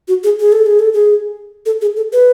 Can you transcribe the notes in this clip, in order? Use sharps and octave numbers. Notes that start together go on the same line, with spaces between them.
F#4
G#4
G#4
A4
G#4
A4
G#4
A4
G#4
A4
B4